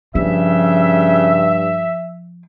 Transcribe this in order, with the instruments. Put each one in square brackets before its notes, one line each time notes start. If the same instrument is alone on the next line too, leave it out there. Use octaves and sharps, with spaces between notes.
[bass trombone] G2 [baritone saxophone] C#3 [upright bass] F3 [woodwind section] E5